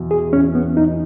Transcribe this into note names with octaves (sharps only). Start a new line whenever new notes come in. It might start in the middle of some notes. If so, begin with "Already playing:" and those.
Already playing: E2 B2
G#4
E2 C#4
B3
E2 D#4